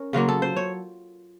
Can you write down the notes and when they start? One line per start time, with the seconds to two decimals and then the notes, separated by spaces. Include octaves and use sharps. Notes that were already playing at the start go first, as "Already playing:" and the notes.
Already playing: C#4 A#4
0.13 C#3 F#3 A#3 F4
0.29 A4
0.42 C5
0.56 C#5